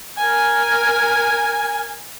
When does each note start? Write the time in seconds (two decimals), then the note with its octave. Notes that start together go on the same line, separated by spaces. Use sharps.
0.17 A#4 G#5